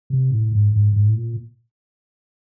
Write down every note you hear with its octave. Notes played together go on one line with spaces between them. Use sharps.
C3
A2
G#2
G#2
G#2
A2
A#2